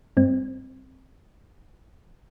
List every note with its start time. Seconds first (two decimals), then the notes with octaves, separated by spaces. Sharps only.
0.17 G2 C4